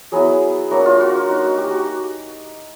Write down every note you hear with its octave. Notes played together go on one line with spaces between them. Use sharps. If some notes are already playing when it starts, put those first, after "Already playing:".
F#3 B3 E4 G#4
F#3 A#3 D4 F#4
F4
F#4
A#3 D#4
G4
F#4